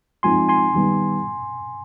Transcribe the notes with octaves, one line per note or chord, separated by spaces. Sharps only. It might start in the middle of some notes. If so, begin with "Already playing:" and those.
F3 G#3 C4 D#4 G#5 C6
G#5 C6
D#3 G3 B3